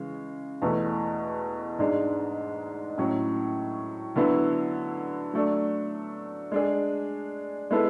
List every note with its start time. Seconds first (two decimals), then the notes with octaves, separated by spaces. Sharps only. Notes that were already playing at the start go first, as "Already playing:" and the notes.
Already playing: C#3 E3 G#3
0.62 E2 B2 A3
1.79 G#2 G#3 D4
2.98 A2 F#3 C#4
4.16 D3 F#3 B3 E4
5.34 F#3 A3 D4
6.52 G#3 D4 G#4
7.71 G#3 B3 E4 A4